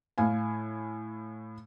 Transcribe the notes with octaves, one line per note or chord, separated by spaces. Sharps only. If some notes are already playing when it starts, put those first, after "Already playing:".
A2 F5 G#5